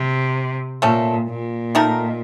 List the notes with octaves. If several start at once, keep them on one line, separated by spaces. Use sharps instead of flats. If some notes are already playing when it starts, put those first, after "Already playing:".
Already playing: C3
A#2 A3 C#4 A4
A#2
D#3 A3 D#4 A#4